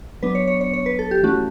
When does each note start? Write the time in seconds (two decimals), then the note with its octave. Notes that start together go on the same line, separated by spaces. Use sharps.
0.23 F#3 B3 D4 B4
0.35 C#5
0.47 C#5
0.61 C#5
0.73 C#5
0.86 B4
0.99 A4
1.11 G4
1.23 E3 A3 C#4 F#4